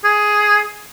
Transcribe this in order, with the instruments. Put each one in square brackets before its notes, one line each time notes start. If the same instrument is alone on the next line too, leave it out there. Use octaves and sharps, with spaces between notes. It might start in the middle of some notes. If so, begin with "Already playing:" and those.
[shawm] G#4